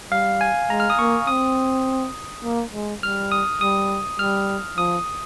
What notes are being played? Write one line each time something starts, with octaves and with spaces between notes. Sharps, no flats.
G3 F5
G#5
G#3 A#5
F6
D#6
A#3 C#6
C4 D#6
A#3
G#3
G3 F6
D#6
G3 D#6
G3 F6
F3 D#6